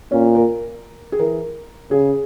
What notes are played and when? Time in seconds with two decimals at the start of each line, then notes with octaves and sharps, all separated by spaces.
0.11 A#2 C#4
0.35 A#4
1.12 G#4
1.19 E3 A#4
1.91 C#3 G#4